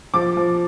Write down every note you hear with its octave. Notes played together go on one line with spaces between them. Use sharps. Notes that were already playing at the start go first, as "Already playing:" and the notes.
F3 D6
F3